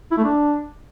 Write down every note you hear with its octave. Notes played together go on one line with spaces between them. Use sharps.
E4
A3
D4